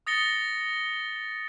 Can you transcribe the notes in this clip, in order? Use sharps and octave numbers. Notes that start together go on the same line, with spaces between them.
D#6 A6 A#6 C#7 G7